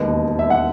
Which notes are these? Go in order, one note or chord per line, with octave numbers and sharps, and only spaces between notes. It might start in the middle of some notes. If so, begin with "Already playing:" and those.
Already playing: E1 D#2 D#3 G#3 B4 D#5
E5
F#5